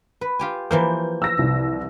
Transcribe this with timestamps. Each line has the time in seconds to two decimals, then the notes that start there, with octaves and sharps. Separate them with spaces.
0.21 B4
0.39 F4 G4 G#5
0.71 E3 F3 A#3 G6
1.22 E6 A#6
1.39 C2